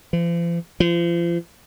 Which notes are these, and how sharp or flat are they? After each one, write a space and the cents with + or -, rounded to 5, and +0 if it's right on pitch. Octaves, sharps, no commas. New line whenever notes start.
F3 -45
F3 -35